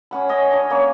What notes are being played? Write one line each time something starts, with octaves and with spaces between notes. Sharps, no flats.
C#4 F#5 B5
C#5 D#5 G#5
D4 C#5
A#3 C#4 C#5